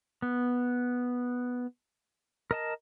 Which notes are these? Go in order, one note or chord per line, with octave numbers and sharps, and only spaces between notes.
B3
A#4 D#5 A5